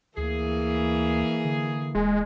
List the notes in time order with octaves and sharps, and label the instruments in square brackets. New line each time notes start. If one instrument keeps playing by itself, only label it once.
[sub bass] D2 [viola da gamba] E3 A#3 [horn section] G#4
[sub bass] D3
[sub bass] D#1 [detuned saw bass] G#3